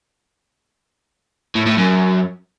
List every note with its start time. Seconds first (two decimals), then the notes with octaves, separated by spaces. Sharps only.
1.56 A2
1.67 A2
1.78 F#2